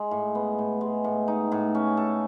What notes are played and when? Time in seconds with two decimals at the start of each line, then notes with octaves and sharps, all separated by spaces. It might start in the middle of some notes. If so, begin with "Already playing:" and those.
Already playing: G#3
0.11 A2
0.35 B3
0.59 A2
0.81 G#3
1.04 A2
1.28 D#4
1.52 A2
1.75 C#4
1.97 A4